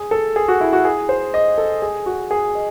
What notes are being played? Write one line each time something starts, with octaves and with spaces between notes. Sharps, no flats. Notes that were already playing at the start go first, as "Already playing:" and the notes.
Already playing: G#4
A4
G#4
F#4
E4
F#4
G#4
C5
D#5
A4
G#4
F#4
G#4
D#5